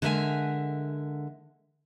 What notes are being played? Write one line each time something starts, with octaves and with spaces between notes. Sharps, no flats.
D3 G#3 A#4 C#5 E5 G#5